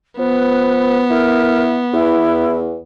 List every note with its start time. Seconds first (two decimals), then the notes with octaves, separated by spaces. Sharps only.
0.19 F3 B3 B4
1.10 E4 A#4
1.93 E2 E4